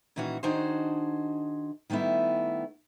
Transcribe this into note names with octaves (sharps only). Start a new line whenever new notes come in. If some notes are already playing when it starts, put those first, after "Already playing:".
A#2 D#3 E3 C#4 F#4
D#3 D4 D#4 F#4 G#4 C5
D#3 G3 A3 B3 E4